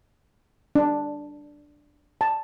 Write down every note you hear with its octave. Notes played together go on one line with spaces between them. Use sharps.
D4
A5